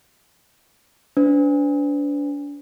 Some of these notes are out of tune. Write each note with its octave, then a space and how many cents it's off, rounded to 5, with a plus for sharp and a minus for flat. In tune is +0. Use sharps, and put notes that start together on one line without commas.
D4 -30 B4 +45